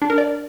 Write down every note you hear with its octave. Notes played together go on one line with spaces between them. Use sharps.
D4
A#4
D5